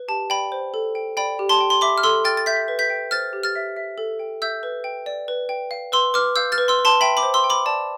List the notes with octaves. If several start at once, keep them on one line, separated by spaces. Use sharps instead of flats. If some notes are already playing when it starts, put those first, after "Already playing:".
Already playing: B4
G4 A5
D5 G5 B5
C5
A4
G5
D5 G5 B5
G4
A5 C6
G5
C6
E5 B5 D6
F6
A4 C6 E6
G5 F6 A6
A6
E5 G6 B6
B4
G6 B6
G5
C5 F6 A6
G4
F6 A6
E5
E5
A4
G5
E5 E6 G6
B4
G5
D5
B4
G5
F5
B4 C6 E6
B4 D6 F6
F5 E6 G6
F6 A6
B4
C6 E6
B4
A5 C6
E5 G5 B5
B5 D6
C5
C6 E6
G5
B5 D6
D5 A5